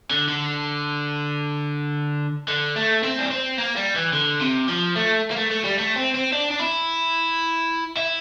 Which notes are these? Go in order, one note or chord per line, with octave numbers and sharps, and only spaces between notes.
D3
D3
D3
A3
C4
D4
C4
A#3
G3
E3
D3
C3
F3
A3
A#3
A3
A3
G3
A3
C4
C4
D4
D4
E4
E4